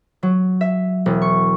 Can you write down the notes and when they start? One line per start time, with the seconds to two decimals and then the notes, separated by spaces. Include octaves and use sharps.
0.23 F#3
0.61 E5
1.06 E1
1.22 C#6